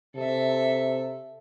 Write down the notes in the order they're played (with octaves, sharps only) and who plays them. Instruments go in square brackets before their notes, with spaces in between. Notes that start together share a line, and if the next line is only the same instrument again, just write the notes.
[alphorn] C3 [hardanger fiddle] A4 E5